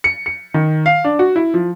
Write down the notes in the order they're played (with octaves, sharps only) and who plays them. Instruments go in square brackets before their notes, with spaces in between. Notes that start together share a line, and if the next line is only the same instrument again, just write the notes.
[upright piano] C#7
C#7
D#3
F5
D4
F#4
E4
F3